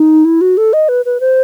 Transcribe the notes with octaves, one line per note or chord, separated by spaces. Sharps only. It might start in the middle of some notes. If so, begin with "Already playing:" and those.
Already playing: D#4
E4
F#4
A4
D#5
B4
B4
C5